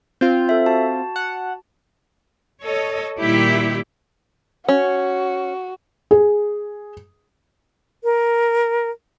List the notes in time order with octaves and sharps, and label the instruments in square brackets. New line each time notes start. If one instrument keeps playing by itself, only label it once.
[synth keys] C4 F4 [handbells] G6
[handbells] A4 E5
F#4 A5
[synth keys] F#5
[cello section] A4 C#5 D#5
A#2 D#3 G3 E4 G4
[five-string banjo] C#4 [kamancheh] F#4
[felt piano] G#4
[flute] A#4